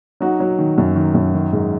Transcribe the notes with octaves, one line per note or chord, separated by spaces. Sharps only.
F#3 D#4 F#4
F#3
D#3
F#2
D#3
F#2
D#3
G#2